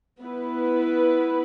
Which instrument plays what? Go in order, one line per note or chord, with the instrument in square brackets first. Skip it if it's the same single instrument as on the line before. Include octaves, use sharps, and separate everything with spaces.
[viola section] B3 E4 B4